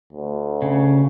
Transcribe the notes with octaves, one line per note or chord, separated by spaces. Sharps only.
D2
C#3